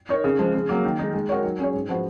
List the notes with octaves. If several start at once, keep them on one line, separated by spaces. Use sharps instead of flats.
D#4 A#4 C#5
C#3
F3 G#3
C#3
F#3 A#3
D#3
G#3 D#4
G#3
D#4 F#4 A#4 C#5
F#3
C#4 G#4 C#5
G#2
F3 B3 F#4 B4